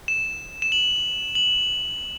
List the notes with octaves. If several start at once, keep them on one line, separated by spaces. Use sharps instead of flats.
E7
E7
F#7
F#7